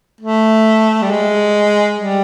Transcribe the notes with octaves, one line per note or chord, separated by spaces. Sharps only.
A3
G3
G#3
G3